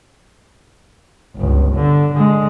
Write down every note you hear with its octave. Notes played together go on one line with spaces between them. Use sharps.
G1 C#2
D3
D3 G#3